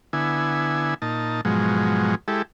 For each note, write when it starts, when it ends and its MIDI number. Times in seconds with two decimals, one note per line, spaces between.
0.13 0.94 50
0.13 0.94 59
0.13 0.94 64
0.13 0.94 80
1.02 1.41 46
1.02 1.41 63
1.02 1.41 81
1.45 2.15 44
1.45 2.15 47
1.45 2.15 53
1.45 2.15 54
1.45 2.15 56
2.28 2.42 56
2.28 2.42 64
2.28 2.42 67
2.28 2.42 69